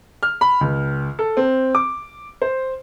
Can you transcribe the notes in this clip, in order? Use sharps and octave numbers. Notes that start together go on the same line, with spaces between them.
F6
B5
C#2
A4
C4
D6
C5